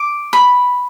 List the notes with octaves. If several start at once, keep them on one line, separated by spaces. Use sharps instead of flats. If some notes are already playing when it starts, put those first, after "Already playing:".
Already playing: D6
B5